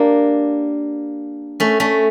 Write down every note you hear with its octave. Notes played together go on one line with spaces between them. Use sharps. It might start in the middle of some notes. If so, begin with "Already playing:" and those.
Already playing: A#3 D4 G4
A3 C#4
A3 C#4